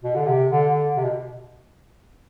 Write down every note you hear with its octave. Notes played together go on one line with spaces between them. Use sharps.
B2
D3
C3
D3
D3
C3
B2